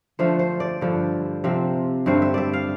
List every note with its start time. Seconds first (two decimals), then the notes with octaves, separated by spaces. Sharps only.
0.19 D3 F3 A3 C5
0.39 C5
0.60 D5
0.81 G2 D3 F3
1.44 C3 F3 C4
2.06 G2 D3 A3 C4 C5
2.22 E5
2.34 D5 E5
2.54 F5